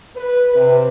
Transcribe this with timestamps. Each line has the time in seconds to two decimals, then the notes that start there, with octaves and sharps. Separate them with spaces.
0.16 B4
0.55 C3